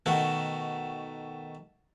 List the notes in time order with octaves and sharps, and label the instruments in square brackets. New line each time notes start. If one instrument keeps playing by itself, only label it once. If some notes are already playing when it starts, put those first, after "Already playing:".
[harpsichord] B2 D#3 A3 F#4